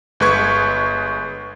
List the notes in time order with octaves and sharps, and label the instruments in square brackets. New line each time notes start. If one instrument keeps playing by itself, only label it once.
[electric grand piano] G1 G#3 B4 C#6 G#6